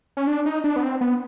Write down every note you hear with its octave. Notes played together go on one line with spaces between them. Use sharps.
C#4
D4
D#4
D4
B3
C4
B3